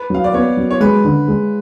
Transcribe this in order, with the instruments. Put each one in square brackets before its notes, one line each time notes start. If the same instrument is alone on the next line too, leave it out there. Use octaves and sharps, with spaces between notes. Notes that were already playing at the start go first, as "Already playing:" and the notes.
Already playing: [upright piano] B4
[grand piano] F#3 [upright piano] F5
[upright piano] D5
[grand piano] B3 [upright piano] C#5
[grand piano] F#3
[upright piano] C#5
[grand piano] G#3 [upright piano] B4
[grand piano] D3
G#3